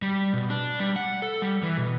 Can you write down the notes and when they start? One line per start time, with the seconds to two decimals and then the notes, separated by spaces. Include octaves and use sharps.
0.02 G3
0.34 B2
0.50 D4
0.80 G3
0.96 F#5
1.22 A4
1.42 G3
1.63 E3
1.77 B2